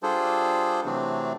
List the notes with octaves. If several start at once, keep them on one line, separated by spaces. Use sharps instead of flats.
G3 D4 F4 G#4 A4 C5
C3 E3 F#3 A3 C4 D4